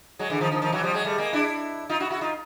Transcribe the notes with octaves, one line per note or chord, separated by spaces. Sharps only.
F#3 G#3
D3 E3
D#3 F3
D#3 F3
D#3 F3
E3 F#3
F3 G3
F#3 G#3
G3 A3
G#3 A#3
D4 E4
D#4 F4
E4 F#4
E4 F#4
D#4 F4